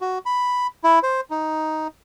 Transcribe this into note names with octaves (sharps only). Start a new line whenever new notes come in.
F#4
B5
E4
C5
D#4